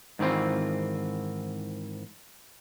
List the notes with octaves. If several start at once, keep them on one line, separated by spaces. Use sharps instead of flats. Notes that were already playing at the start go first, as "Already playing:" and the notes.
G#2 D#3 E3 C4 F4